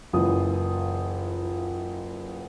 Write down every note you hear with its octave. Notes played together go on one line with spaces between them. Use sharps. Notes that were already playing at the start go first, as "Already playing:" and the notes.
F#1 E3 F4 D#6